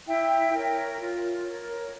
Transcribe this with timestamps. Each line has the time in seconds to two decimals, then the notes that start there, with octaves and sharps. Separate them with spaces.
0.07 E4 E5 G5
0.53 A#4 C#5
0.99 F4
1.44 A#4 C#5